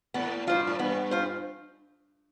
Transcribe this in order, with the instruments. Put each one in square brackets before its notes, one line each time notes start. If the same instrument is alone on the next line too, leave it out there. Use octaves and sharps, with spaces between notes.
[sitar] A2 [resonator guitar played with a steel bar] B3
[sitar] G2 [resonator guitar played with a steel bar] F4 C5
[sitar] A2
[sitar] G2 [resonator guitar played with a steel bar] B3
[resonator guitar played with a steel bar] F4 C5